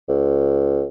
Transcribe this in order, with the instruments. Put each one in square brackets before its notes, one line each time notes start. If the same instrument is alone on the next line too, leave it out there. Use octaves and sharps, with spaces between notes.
[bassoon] C#2